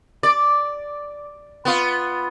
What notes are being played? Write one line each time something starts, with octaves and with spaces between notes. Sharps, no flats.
D5
B3 F4